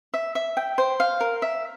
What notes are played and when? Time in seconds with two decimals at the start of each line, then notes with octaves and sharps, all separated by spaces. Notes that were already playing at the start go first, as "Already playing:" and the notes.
0.14 E5
0.35 E5
0.57 G5
0.78 C5
1.00 F5
1.21 A#4
1.42 E5